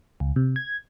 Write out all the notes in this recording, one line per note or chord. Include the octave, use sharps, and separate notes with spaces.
C#2
C3
G#6